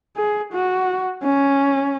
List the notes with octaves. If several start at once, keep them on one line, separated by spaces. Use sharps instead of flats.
G#4
F#4
C#4